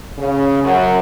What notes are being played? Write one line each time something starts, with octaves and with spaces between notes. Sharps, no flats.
C#3
F#2